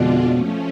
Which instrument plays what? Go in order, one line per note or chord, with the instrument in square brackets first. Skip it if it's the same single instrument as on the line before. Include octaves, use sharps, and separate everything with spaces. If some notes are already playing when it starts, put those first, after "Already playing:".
Already playing: [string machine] F2 D3 G#3 D4 F4 [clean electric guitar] B2
[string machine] F3 A3 C#4